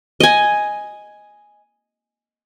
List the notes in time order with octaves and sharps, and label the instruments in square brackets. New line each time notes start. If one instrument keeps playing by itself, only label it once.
[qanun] D#5 G#5